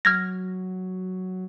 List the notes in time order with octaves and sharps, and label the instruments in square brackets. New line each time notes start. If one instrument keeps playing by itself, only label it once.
[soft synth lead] F#3 [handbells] F6 G#6 A#6